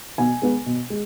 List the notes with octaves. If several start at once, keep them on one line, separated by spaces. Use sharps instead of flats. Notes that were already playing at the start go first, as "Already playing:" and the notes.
B2 G#5
G#3 B3
B2
G#3